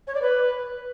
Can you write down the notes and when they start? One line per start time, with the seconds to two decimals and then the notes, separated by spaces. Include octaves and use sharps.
0.07 C#5
0.15 D5
0.22 B4